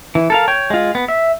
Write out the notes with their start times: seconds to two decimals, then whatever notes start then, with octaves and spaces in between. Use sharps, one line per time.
0.15 E3
0.30 A4 A#4 F5
0.48 C#5 G5
0.70 G#3 F4
0.95 B3
1.08 E5